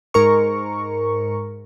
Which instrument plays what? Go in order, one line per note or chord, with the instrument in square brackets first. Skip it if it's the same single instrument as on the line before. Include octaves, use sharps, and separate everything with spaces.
[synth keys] G#2 A#4 C#6